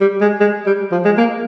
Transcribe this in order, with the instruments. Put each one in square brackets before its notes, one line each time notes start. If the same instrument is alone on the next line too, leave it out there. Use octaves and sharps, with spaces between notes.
[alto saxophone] G3
G#3
G#3
G3
F3
G#3
A#3